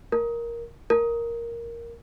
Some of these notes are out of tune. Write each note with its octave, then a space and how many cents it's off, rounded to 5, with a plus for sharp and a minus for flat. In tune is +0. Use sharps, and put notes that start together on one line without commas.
A#4 +5
A#4 +0